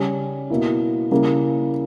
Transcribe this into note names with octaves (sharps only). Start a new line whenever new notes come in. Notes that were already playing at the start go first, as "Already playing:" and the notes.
Already playing: C#3 G3 C#4
B2 A#3 E4
C#3 G3 A#3 E4